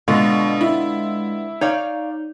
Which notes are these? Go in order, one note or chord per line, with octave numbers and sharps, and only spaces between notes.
B2 D3 G#3 B3 F4
E4
D#4 C#5 D5 F5